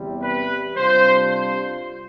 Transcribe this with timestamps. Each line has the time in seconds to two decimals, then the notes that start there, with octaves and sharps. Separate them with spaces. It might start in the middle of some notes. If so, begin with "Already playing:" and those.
Already playing: E2 C3 G3
0.22 B4
0.75 C3 G3 D4 F4 C5
1.30 C5